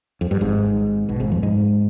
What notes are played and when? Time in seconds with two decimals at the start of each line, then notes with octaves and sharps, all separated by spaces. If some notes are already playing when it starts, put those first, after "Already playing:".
0.21 F2
0.31 G2
0.41 G#1 G#2
1.09 B1 B2
1.20 G#1 G#2
1.32 F2 F3
1.43 G#2 G#3